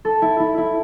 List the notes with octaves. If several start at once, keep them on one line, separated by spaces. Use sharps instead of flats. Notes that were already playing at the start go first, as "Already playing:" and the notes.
A4
E4
E4
E4